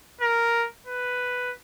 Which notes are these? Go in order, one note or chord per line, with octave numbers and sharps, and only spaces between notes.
A#4
B4